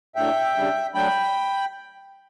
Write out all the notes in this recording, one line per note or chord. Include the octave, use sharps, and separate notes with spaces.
A2 F#3 A3 D4 E5 G5
C#3 G3 D4
F#3 A3 D4 G5 B5